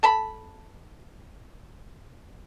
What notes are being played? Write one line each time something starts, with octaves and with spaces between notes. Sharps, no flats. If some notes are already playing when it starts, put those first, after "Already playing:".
A4 A5 B5